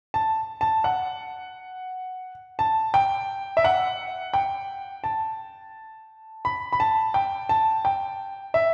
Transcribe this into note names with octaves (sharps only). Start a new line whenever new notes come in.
A5
A5
F#5
A5
G5
E5
F#5
G5
A5
B5
B5
A5
G5
A5
G5
E5